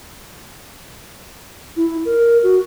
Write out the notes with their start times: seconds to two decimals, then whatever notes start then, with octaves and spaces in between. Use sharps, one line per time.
1.76 E4
2.05 A#4
2.43 F#4